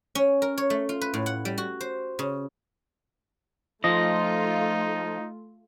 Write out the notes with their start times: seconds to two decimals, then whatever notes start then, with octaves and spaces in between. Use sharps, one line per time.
0.15 C#4
0.42 A#4
0.58 C#5
0.70 A3
0.89 F4
1.01 B4
1.14 A2
1.26 F#5
1.45 G3
1.58 F#4
1.81 C5
2.19 C#3
3.84 F3 A3 D#4 F4 D#5